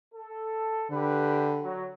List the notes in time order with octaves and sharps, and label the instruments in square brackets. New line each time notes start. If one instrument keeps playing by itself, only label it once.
[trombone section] A4
[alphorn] D3 [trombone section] G4 B4
[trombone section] F#3